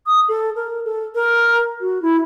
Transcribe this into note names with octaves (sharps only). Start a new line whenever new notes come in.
D#6
A4
A#4
A4
A#4
F#4
E4